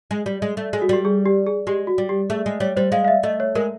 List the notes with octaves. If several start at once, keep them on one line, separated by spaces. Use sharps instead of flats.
G#3
G3
G#3
A3
G#3
F#4
G3 G4
G#4
G4
G#4
G#3 G4
F#4
G3
G4
A3 G#4
G#3
G3 C#5
G3 C5
G#3 F5
F5
E5
A3 D#5
C#5
G#3 A#4